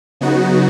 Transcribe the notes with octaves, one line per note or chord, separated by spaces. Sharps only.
C#3 F#3 B3 D#4 F#4